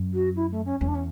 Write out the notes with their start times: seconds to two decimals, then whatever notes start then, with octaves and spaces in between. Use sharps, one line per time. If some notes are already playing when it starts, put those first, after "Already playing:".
Already playing: F#2
0.14 F#4
0.36 E4
0.51 A3
0.65 C#4
0.80 E2 C#4
0.88 D4
0.95 C#4